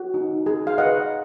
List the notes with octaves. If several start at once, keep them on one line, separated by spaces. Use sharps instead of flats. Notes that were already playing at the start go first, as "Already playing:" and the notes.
Already playing: F#4
D#4
G#4
F5
B4 D#5 F#5